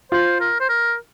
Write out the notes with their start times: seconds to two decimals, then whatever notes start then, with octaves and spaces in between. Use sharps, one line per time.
0.12 F4 C5
0.40 A#4
0.60 C5
0.69 A#4